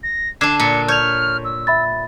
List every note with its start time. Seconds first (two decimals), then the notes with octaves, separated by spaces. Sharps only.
0.03 A#6
0.41 D3 D4 D6 G#6 C7 E7
0.60 A#2 C#7
0.88 C#5 F6 G6 G#6 F7
1.45 E6
1.67 E5 B5 A6